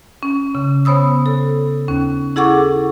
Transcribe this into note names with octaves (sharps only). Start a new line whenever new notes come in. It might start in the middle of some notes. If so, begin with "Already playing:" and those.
C#4
C#3
B3 C5 C#5 B5 D#6 E6
A4
D#2 C#4
E4 G#4 A4 F#5 C#6 D6